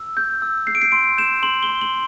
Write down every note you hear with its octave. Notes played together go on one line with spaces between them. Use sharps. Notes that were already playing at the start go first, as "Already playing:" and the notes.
Already playing: E6
G6
E6
G6 C7
D7
C7
C6 D7
G6 E7
C6 F#7
G7
C6
F#7